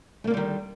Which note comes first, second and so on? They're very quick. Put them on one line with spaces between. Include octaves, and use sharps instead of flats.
A3 A#3 D3 G3 D#3